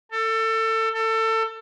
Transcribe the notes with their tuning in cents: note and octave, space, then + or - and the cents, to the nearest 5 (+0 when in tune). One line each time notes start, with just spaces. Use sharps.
A4 +25
A4 +25